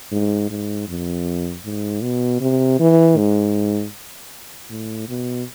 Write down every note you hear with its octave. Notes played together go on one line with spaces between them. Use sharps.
G#2
G#2
F2
G#2
B2
C3
E3
G#2
A2
B2